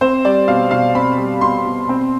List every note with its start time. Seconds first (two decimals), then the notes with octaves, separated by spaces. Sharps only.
0.01 C4 C5
0.25 G3 D5
0.48 B2 F5
0.71 B2 F5
0.95 C4 B5
1.18 G3
1.41 B2 C6
1.66 B2
1.89 C4